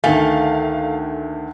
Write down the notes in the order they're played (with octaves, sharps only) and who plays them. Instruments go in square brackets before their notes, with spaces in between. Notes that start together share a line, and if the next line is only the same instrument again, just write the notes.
[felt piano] D2 D#3 G#5 [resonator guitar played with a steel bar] A3 [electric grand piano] F5